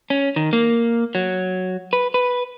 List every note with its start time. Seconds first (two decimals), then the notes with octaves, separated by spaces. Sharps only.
0.10 C#4
0.36 D#3
0.53 A#3
1.15 F#3
1.93 B4
2.14 B4